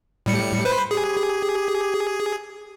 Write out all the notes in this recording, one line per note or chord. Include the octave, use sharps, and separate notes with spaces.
A2 G3 C#7
B4 C5 B5
G4 G#4